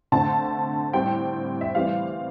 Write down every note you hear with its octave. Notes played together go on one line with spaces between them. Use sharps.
D3 A3 C4 A5
A2 G3 C4 G5
E5
A2 E3 G3 C4 F5